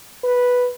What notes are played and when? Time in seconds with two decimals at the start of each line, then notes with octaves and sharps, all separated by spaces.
0.24 B4